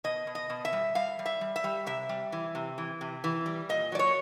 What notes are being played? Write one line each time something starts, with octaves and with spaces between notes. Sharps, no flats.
B2 D#5
B2
D#5
B2
E5
G3
G3 F5
G3
E5
G3
E5
G3
C3 E5
G3
E3
C3
E3
C3
E3
G3
A#2 D#5
F#3 D5
C#5